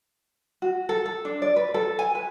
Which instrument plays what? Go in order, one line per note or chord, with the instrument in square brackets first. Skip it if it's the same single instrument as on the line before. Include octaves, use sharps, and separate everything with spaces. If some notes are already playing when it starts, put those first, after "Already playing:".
[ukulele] F#4
A4
A4
D4
D5
B4
A4
G#5
B4